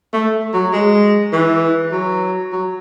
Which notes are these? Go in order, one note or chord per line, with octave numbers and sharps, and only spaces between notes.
A3
F#3
G#3
E3
F#3
F#3